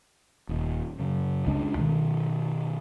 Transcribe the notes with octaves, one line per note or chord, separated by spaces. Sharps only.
D#1
F#2 C#3
C#2 G#3 C#4 D4
B2 D#3